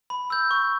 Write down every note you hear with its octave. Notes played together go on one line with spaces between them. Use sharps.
B5
E6 G6
C#6